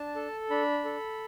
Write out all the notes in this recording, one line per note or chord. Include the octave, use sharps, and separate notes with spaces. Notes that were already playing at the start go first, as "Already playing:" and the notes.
Already playing: D4 A5
A4
D4 B5
A4